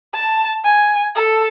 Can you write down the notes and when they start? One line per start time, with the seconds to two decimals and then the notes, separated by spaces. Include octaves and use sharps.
0.14 A5
0.64 G#5
1.15 A4